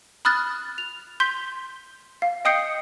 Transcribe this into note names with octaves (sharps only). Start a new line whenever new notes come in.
B5 D#6 F6 F#6 A6
F7
C6 G6 B6 G7
F5
D#5 G5 D#6 G6 C7 C#7